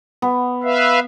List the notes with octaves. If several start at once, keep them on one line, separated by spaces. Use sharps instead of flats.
B3
B4 E5 F5